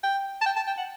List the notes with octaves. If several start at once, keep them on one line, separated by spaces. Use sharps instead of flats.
G5
A5
G5
A5
G5
F#5